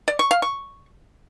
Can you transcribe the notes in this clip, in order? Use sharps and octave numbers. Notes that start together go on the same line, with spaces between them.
D5
C#6
F5
C#6